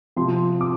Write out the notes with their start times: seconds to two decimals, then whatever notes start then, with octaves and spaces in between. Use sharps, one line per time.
0.16 C3 F3 C6
0.61 D6